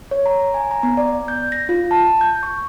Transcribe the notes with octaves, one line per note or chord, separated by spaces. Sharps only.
C#5
A#5
G#5
A#5
B3
D5
G6
A#6
F4
A5
G6
C#6